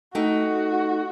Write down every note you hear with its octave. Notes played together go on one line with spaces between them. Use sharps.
A3 D#4 F#4 G5